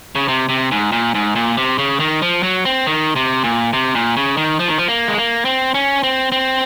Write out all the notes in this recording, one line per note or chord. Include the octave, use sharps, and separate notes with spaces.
C#3
C3
C3
G#2
A#2
G#2
A#2
C3
C#3
D#3
F3
F#3
C4
D#3
C3
A#2
C3
A#2
C#3
D#3
F3
D#3
F3
A#3
G#3
A#3
C4
C#4
C4
C4